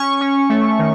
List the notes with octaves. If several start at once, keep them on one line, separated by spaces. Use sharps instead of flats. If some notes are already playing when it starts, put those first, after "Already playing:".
Already playing: C#4 C#6
C#4
A3
D#3